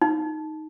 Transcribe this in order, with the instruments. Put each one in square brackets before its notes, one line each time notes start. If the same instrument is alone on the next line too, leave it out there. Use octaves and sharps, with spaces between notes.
[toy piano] D#4